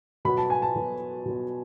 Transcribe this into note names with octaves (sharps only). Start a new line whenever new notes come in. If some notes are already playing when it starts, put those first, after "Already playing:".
B2 F#3 B3 B5
A5
G#5
A5
B2 F#3 B3
B2 F#3 B3